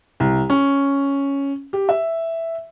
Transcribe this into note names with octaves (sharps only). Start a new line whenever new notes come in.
C2
C#4
G4
E5